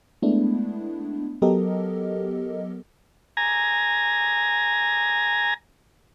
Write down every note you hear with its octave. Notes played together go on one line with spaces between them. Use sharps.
G#3 A3 B3 D4 E4
F#3 B3 G4 A4 A#4 D#5
G#5 A#5